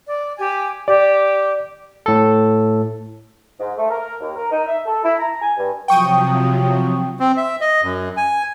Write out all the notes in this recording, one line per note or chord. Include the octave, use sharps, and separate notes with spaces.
D5
G4 G#5
G4 D5
A2 A4
G#2
A3
A#4
D#2
A#4
D#4
E5
A4
E4
A#5
G#5
G2
C3 F3 F#3 G5 C#6 D#6
C4
E5
D#5
F#2
G#5